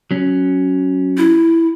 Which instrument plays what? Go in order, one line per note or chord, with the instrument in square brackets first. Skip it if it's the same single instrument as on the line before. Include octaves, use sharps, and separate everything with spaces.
[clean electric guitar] F#3 C#4
[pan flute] E4